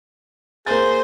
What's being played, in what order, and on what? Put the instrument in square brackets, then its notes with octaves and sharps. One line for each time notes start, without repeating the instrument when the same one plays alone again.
[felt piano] A#3 A6 [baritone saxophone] G#4 [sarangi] C5